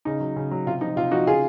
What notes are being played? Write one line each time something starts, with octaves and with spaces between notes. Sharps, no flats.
C#3 D#4
F#3
C#3
F#3
C3 F4
F3 D#4
C3 F4
F3 D#4 F#4
C#3 F4 G#4